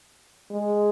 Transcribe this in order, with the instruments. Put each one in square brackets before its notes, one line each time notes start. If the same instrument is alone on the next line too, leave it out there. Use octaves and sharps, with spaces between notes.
[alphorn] G#3